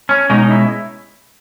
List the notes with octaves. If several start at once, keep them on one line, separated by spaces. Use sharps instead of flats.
C#4
B2 G#3 C#4 D#4
D#4
E4